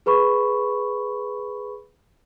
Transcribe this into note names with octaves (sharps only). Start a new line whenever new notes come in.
G#4 B4 B5 C#6